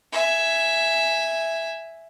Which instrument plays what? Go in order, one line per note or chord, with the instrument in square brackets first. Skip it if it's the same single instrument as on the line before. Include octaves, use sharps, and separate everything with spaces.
[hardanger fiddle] E5 G#5